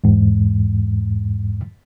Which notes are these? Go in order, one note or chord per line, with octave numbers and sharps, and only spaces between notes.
E2 G#2